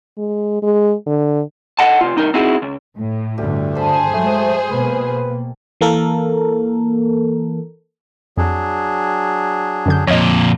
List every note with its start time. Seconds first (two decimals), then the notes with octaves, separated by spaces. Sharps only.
0.18 G#3
0.63 G#3
1.06 D3
1.79 A4 D#5 F#5 A5
2.01 C3 F4
2.16 C2 D#4 A#4
2.34 C4 D#4 E4 F#4 G#4
2.62 C#2
2.98 A2
3.38 D2 G2 D3 G4
3.75 G#4 A4 C5 B5
4.13 F#3 G#3 A3
4.71 B2 A#3 B4
5.81 E3 A#3 A4 A#4
8.37 F2 F#3 D4 G#4
9.86 F#2 D3 G6
10.07 F2 A#2 C#5 D#5